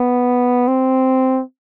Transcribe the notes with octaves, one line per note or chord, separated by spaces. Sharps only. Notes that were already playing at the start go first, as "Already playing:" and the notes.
Already playing: B3
C4